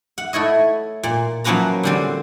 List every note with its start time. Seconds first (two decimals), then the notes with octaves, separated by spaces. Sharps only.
0.18 F#5
0.33 A3 E4 C#5 D#5
1.03 A#2
1.44 F3 F#3 A#3 C#4 B4 A#5
1.83 D3 G3 C4